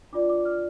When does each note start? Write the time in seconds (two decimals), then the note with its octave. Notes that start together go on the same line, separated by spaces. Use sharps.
0.13 D4 F4 D5 D6
0.29 D6
0.45 F6